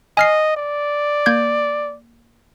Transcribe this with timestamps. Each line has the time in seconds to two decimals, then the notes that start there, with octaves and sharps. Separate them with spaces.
0.17 D#5 G#5 F6 C7
0.56 D5
1.26 A#3 G6 G#6